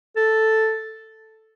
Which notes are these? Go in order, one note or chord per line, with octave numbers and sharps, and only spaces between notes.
A4